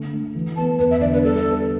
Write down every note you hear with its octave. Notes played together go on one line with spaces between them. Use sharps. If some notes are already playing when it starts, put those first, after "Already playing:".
Already playing: D3 A3
A3
E3
B3 A5
E2 B4
E5
D3 D5
B4
G3 A4
B3